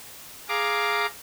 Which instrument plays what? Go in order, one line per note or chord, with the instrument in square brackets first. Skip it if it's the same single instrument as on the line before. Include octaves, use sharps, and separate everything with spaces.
[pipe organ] G#4 F5 A#5 D6